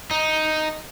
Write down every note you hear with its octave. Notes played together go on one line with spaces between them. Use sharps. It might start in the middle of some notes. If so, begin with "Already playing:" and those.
D#4